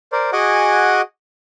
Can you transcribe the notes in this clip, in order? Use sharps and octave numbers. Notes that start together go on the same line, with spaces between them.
A#4 C5 D5
F#4 G#4 D#5 F#5 G#5 D6